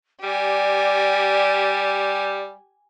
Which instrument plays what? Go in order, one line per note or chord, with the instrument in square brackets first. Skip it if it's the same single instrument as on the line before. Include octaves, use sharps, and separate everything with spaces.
[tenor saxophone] G3 [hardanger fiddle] G4 G#5 [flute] D5